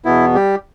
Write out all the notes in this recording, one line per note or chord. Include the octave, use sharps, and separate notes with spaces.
E2 B2 B3 E4
G3 G4